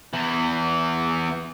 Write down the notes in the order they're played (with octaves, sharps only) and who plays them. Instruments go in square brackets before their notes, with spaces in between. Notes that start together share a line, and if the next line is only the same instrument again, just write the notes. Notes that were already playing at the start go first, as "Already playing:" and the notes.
[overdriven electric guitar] E2 E3